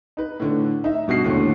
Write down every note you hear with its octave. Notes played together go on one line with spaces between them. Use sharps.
D#4 B4
A2 D3
D#4 E5
G2 B2 F#4 C7
D#2 A2 D3